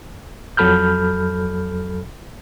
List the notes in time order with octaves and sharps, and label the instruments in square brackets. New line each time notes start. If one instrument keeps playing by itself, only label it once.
[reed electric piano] F2 F#3 A4 B5 F6 G6